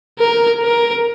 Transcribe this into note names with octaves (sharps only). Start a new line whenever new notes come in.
A#4
A#4